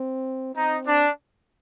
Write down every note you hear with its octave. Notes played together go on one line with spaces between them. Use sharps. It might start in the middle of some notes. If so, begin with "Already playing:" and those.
Already playing: C4
C4 D#4
D4